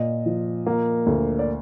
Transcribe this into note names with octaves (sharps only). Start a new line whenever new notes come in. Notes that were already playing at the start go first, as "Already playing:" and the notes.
Already playing: A#2 D#5
F3
A#3
D2
D5